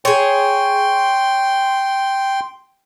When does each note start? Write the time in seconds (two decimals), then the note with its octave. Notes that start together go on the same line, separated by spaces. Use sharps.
0.05 G#4 C#5 G5 C6